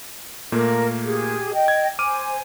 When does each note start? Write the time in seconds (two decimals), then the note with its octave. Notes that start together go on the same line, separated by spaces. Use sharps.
0.52 A#2 A3 A#3 A#4
1.03 G4 G#4
1.54 D#5 G5
1.68 G#6
1.99 C5 G#5 D6 F6 D#7